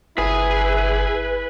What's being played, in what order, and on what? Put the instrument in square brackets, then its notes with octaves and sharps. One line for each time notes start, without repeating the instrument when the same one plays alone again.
[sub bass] G1 [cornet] E4 [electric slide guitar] G#4 [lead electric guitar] B4